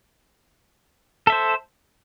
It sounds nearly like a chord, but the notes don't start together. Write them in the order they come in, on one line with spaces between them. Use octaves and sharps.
A4 E5 C5